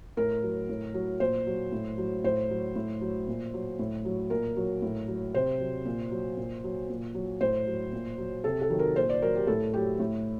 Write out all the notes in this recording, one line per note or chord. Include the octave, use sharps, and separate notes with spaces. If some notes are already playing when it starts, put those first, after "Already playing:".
A2 A#4
F#3
A2
F#3
A#2 C5
F#3
A2
F#3
A2 C5
F#3
A2
F#3
A#2
F#3
A2
F#3
A#2 A#4
F#3
A2
F#3
C3 C5
F#3
A#2
F#3
A#2
F#3
A#2
F#3
A2 C5
F#3
A#2
F#3
C3 A4
A4
D#3 F#3
A#4
A#2 C5
D5
F#3 A#4
G4
A2 A4
F#3 G4
A2